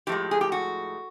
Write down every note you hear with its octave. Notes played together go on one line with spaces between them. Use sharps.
A2 F3 G#3 G4
G#4
G4
F#4